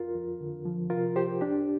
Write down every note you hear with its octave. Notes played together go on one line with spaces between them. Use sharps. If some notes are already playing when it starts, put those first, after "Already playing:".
Already playing: F2 F4 A#4
F2
D3
F3
C3 F4 A#4
C2 G4 C5
C2 D4 G4